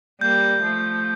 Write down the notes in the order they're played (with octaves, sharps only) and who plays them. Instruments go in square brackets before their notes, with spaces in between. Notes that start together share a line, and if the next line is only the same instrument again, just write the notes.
[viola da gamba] G3 A#3 [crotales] G6
[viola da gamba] F3 A3